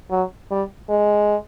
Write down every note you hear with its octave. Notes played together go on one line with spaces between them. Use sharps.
F#3
G3
G#3